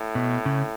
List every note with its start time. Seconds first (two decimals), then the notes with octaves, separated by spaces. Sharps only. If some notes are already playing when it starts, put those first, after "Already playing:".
Already playing: A2
0.15 B2
0.46 C#3